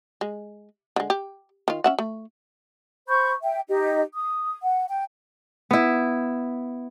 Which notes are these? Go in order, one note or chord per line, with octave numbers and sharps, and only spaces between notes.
G#3
D3 G#3
G4
D#3 F4
C#4 E5 F#5
A3
C5 B5 C#6 G6
E5 G5
D#4 G4 D#5
D#6
F#5
G5
B3 E4